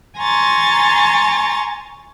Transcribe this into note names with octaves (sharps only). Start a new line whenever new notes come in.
G#5 A#5 C6 C#6 A6